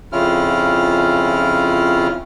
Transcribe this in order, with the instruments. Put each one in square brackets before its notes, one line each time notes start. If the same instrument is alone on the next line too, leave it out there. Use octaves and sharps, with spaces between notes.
[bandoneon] F2 C#3 C#4 E4 F4 F6